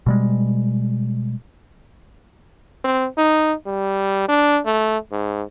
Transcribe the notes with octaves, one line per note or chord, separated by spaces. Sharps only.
B2 G3 G#3
C4
D#4
G3
D4
A3
G#2